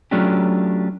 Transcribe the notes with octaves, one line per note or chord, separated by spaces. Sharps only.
F#3 A3 C#4 D4 F4 G4